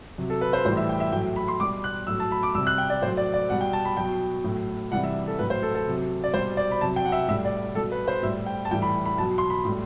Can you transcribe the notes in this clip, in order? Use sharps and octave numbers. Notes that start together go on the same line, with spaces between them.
C3 F#3
A4
B4
C5
A2 E3 G3 C5
E5
G5
E5
A2 F#3 G5
B5
C6
B2 G3 D6
F#6
A2 F#3 E6
A5
B5
D6
C3 G3 E6
F#6
G5
D5
A2 F#3 C5
D5
D5
B2 G3 F#5
G5
A5
B5
B2 F#3 G5
A2 F#3
C3 E3 G3 F#5
E5
A4
A2 F#3 B4
C5
A4
A4
C3 F#3
D5
B2 G3 C5
D5
B5
C3 F#3 A5
G5
F#5
E5
A2 G3 E5
D5
B2 G3 A4
B4
C5
A2 G3 E5
G5
A5
A2 E3 G3 G5
B5
B5
B2 F#3 A5
C6
B5
A2 G3